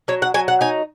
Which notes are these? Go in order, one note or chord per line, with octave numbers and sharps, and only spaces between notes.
F#3 C#5
F#5
F#3 G#5
F#5
D#4 G#5